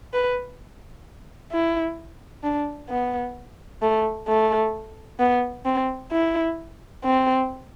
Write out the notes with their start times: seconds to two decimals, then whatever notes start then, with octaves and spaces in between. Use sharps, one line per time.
0.13 B4
1.52 E4
2.43 D4
2.89 B3
3.82 A3
4.28 A3
5.19 B3
5.65 C4
6.12 E4
7.04 C4